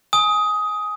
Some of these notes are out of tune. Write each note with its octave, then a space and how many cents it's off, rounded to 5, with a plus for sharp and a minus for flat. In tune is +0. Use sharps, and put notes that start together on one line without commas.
G#5 +5 D#6 +15